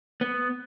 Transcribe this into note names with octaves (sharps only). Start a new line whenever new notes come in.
B3